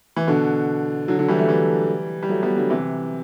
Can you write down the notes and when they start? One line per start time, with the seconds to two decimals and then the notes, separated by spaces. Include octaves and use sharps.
0.16 E3
0.27 B2 D3
1.08 D3 F#3
1.19 D3 F#3
1.28 E3 G3
1.39 F#3 A3
1.48 E3 G3
2.23 G3
2.29 F#3 A3
2.43 G3 B3
2.56 D3 F#3
2.70 C3 E3